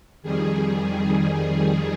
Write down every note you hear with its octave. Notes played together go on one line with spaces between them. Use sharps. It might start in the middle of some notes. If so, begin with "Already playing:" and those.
F2 D#3 G3 G#4